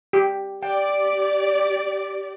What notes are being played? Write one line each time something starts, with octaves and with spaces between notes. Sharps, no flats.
G4
G4 D5 G5